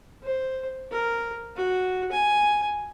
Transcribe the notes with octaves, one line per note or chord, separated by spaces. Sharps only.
C5
A#4
F#4
G#5